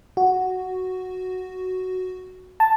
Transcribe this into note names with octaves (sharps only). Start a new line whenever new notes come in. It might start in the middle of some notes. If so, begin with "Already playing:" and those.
F#4
A5